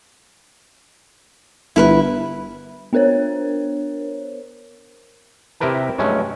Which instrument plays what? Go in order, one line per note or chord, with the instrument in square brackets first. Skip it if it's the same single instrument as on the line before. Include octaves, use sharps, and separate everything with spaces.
[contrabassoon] G1 [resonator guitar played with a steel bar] E4 A#4 B4
[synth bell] B3 D4 A#4 C5 C#5
[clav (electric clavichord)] C3 E4 G4 A#4 B4 A5
G2 F#3 G#3 A3 C#4